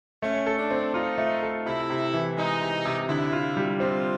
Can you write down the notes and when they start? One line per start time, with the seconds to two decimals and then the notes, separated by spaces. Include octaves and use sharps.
0.22 A3 C#4
0.46 A4
0.58 D4
0.71 C4
0.94 D#4 F4
1.18 A3
1.43 A4
1.66 C3 E4
1.90 C3
2.14 E3
2.37 G#3 D#4
2.61 C3
2.85 C3
3.09 D3 E4
3.32 F4
3.57 G3
3.80 C4 F4